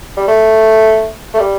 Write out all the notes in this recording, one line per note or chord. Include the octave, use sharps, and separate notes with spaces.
G3
A3
A3
G3